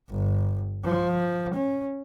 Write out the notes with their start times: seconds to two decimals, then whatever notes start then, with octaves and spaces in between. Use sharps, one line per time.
0.10 G1
0.84 F3
1.54 C#4